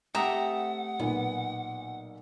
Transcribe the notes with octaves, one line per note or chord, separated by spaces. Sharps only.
A3 C4 G4 E5 F#5 A#5 D#6
B1 A#2 B3